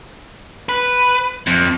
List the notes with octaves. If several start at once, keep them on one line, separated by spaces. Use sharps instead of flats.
B4
F2